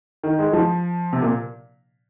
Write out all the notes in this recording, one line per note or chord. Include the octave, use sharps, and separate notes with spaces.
D#3
G#3
F3
C3
A#2